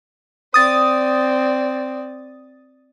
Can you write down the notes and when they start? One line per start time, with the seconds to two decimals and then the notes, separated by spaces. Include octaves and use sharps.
0.54 C4 D5 D#6 A6